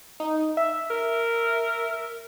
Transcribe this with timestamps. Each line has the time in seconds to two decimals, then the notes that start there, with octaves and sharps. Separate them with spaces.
0.20 D#4
0.57 E5
0.90 A#4